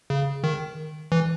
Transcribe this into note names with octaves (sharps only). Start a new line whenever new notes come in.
C#3
D#3
E3